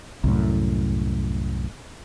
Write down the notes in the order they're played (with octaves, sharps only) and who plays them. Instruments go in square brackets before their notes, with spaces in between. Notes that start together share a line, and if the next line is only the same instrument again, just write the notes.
[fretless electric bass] C2 F#2 A2